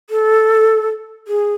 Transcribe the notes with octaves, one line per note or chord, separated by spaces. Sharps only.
A4
G#4